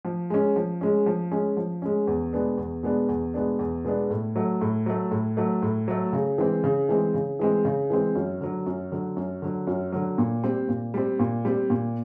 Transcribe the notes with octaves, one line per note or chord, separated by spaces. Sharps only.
F3
G#3 C#4
F3
G#3 C#4
F3
G#3 C#4
F3
G#3 C#4
E2
B2 G#3 B3 D4
E2
B2 G#3 B3 D4
E2
B2 G#3 B3 D4
E2
B2 G#3 B3 D4
A2
F#3 A3
A2
F#3 A3
A2
F#3 A3
A2
F#3 A3
C#3
E3 G#3 C4
C#3
E3 G#3 C4
C#3
E3 G#3 C4
C#3
E3 G#3 C4
F#2
D3 F#3
F#2
D3 F#3
F#2
D3 F#3
F#2
D3 F#3
A#2
G3 C4
A#2
G3 C4
A#2
G3 C4
A#2